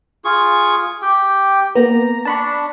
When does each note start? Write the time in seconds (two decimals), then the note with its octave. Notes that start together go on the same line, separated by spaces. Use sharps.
0.25 F4 G#4 C#6
1.02 G4 G5
1.75 A#3 B3 A#5
2.25 D4 A5 B5 C#6